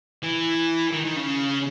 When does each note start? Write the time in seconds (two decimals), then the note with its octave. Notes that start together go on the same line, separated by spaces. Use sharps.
0.23 E3
0.92 D#3
1.04 D#3
1.16 C#3